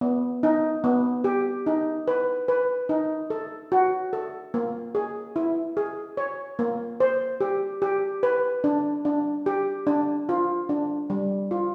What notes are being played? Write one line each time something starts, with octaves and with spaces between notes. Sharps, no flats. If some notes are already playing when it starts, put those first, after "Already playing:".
B3
D#4
B3
G4
D#4
B4
B4
D#4
A4
F#4
A4
A#3
G#4
E4
G#4
C#5
A#3
C5
G4
G4
B4
D4
D4
G4
D4
F4
D4
G3
F4